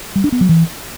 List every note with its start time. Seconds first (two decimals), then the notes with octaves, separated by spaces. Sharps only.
0.16 G3
0.24 D4
0.32 B3
0.41 F#3
0.49 E3